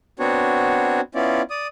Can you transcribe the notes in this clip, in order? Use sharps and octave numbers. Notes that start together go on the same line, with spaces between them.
B3 C4 D4 F#4 C#5
B3 C#4 E4 F4 D5
D5 D#6